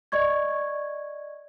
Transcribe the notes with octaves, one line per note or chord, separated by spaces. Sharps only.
D5 D#5 C#6 G#6